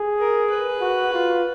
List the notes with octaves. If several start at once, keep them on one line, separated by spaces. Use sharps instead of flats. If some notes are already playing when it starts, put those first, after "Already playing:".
Already playing: G#4
A#4
B4
F#4
F4